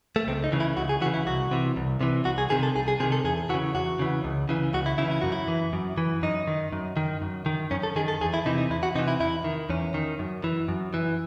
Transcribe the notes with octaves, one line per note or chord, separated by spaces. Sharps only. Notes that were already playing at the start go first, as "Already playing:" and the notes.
A3
C#2 C4
D#4
C#3 E3
E4
C#2 F#4
G#4
C#3 E3 F#4
E4
C2 F#4
C3 E3
C2
C3 E3
C2 F#4
G#4
C3 D#3 G#4
A4
C2 G#4
G#4
C3 D#3 G#4
A4
E2 G#4
C#3 E3 F#4
E2 F#4
C#3 E3
C#2
C#3 E3
C#2 F#4
E4
C#3 E3 E4
E4
F#2 F#4
E4
E3
F#2
E3
F#2 D#4
D#3
F#2
D#3
F#2
D#3
F#2 C#4
A4
D#3 G#4
A4
E2 G#4
E4
C3 E3 D#4
D#4
E2 E4
F#4
C3 E3 D#4
E4
E2 E4
D#3
E2 C#4
D#3
F#2
E3
F#2
E3